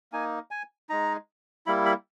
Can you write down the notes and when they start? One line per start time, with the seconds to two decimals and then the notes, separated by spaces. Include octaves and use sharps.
0.12 A#3 D#4 G#5
0.51 G#5
0.89 G#3 D#4 A#5
1.66 G3 A#3 E4 B5
1.85 B5